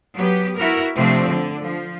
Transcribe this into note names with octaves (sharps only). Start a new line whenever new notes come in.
F#3 B3 G4
E4 F#4 A#4
C3 F3 A3 C4 D4
D3
F3